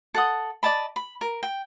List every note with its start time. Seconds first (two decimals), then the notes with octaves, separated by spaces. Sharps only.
0.14 A4 F#5 D#6
0.63 D5 D#5 A5 B5
0.96 B5
1.21 A#4
1.43 G5